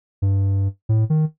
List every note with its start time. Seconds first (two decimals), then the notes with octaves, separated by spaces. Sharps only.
0.22 G2
0.89 A2
1.10 D#3